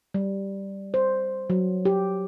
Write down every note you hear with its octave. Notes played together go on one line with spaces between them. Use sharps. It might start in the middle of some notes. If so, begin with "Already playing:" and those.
G3
C5
F#3
G4